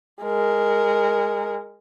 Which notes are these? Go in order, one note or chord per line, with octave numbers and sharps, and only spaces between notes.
G#3 A#4